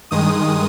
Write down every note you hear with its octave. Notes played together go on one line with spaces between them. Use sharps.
G2 D#3 G#3 D#6